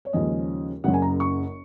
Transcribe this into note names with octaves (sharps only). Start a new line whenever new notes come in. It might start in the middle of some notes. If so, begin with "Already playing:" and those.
C#5
D#2 C#3 F3 G#3 C#4 D#5
F#1 F#2 C#3 F#3 F#5
G#5
A#5
C#6